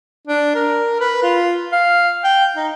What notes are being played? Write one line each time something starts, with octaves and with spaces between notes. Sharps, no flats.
D4
A#4
B4
F4
F5
G5
D#4